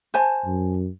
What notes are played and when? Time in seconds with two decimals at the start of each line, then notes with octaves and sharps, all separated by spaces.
0.14 C5 G#5 A5
0.46 F#2